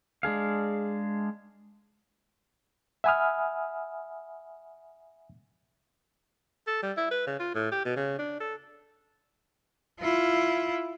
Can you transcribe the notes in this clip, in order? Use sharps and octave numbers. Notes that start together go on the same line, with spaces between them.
G#3 D4 G#4 F5
E5 F#5 G#5 B5 D#6 F6
A4
G3
E4
B4
C#3
F4
A2
G4
B2
C#3
D4
A4
E4 F4